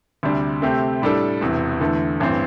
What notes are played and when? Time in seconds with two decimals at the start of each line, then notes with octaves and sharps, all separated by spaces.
0.23 D2 C3 G3 D4
0.62 C3 A3 C4 G4
1.02 A2 G3 D4 A4
1.41 E1 E2 C3
1.80 E2 D3 A3
2.20 A1 G2 E3 C4